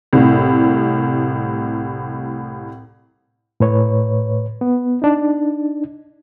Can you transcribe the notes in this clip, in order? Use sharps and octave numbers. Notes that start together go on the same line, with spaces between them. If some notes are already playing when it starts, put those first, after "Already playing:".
C2 A2
A2 B4 C#5
B3
D4 D#4